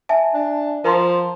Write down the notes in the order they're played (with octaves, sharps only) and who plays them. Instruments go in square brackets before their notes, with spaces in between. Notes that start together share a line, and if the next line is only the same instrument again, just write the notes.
[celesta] E5 G#5 A5
[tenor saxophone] D4
[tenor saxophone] F3 [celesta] A#4 A#5 C6